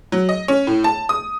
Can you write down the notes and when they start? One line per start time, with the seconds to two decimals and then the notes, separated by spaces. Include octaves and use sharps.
0.12 F#3
0.29 D#5
0.48 C#4
0.67 A2
0.84 A5
1.09 D#6